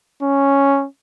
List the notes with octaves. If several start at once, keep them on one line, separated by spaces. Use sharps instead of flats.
C#4